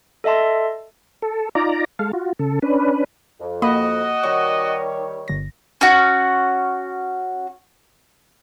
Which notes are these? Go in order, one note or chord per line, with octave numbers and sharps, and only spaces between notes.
A4 D#5 E5 A5 C6
A4
D#4 F4 D5 A#5
G#3 A4 F5
F4 F#4
C#3 A4
C#4 D4 B4
F2
A#3 F#4 D#5 B5 D#6
D#3 G3 C#5 C#6
G1 A#6
C#4 F#4